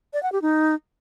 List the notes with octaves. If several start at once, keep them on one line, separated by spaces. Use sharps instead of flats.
D5
F#5
G4
D#4